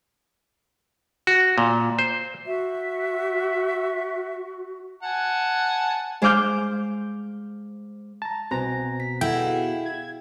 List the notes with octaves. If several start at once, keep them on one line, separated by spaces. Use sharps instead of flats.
F#4
A#2
C5
F#4 E5
F#5 G#5 A5
G#3 C5 F5 D6 F6 G6
A5 A#5
C2 B2 C4 C5 G#5 A#5 A#6
B6
E4 G#4 A4 F#5 G5
F5
G#6